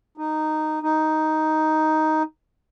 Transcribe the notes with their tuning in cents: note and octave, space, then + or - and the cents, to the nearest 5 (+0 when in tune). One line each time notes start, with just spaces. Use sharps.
D#4 -10
D#4 +5